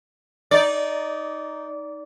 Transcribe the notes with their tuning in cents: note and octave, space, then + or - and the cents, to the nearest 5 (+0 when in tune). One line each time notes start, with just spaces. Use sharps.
D#4 +0 D5 -20